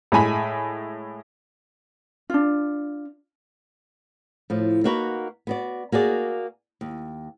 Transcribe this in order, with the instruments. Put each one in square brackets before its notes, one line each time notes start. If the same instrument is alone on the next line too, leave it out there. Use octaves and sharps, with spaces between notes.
[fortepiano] A2 G#3 G#5 B5
[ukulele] D4 F4
[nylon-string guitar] A2 F3
A#3 D#4 F#4 A#4 B4
B3 F#4 D5
A#3 F#4 G#4 D5
D#2